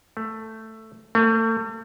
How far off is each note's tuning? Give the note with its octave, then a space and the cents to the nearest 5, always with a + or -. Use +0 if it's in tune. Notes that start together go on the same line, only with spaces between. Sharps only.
A3 +10
A3 +40